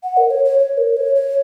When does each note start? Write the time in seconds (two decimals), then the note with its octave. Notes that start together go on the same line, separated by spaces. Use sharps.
0.03 F#5
0.17 A#4
0.31 C#5
0.45 C#5
0.59 C#5
0.78 A#4
0.97 C#5
1.15 C#5